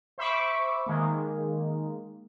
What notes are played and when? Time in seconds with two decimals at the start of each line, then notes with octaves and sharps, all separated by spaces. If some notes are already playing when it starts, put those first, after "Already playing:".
0.18 C5 E5 B5 C#6 D6
0.86 D#3 G#3 A#3